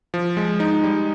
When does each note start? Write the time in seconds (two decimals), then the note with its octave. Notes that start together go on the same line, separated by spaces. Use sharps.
0.14 F3
0.37 G#3
0.60 D#4
0.84 G3